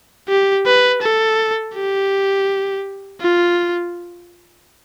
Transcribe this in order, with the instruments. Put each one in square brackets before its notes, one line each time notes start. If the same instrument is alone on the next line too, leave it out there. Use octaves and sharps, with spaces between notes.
[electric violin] G4
B4
A4
G4
F4